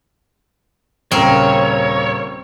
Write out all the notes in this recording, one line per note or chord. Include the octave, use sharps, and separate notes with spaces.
D#1 C#3 C4 A#4 C#5